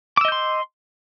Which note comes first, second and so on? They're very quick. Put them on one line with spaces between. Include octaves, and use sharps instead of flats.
D6 E6 D#5 G6 C6